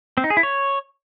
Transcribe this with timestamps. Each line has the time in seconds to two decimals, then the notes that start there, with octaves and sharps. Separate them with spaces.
0.17 C4
0.24 D#4
0.30 G#4
0.37 E4
0.43 C#5